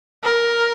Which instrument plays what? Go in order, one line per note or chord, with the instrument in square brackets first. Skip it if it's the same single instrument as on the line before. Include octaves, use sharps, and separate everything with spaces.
[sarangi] A#4